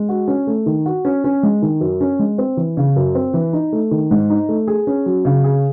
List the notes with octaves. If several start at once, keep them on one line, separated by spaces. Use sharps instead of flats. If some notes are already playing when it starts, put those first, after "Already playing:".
Already playing: G#3
F#4
C#4
A3
D#3
F#4
C#4
C#4
G#3
D#3
F#2
C#4
G#3
C4
E3
C#3
F#2
C4
E3
D#4
A3
D#3
G#2
D#4
A3
G#4
C#4
F#3
C#3
G#4